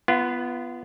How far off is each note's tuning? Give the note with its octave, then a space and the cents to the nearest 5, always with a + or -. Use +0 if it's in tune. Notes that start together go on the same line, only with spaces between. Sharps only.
B3 +0 F4 -30